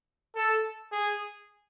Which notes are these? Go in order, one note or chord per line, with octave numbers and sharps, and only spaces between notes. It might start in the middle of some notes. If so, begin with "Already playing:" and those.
A4
G#4